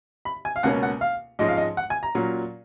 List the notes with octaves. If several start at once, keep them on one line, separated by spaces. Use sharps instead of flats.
B5
G#5
F5
C#2 B2 A#3 C#4 F#5
F#5
F5
G#2 F3 G#3 C#4 D#5
F5
D#5
F#5
G#5
A#5
A#2 F#3 C#4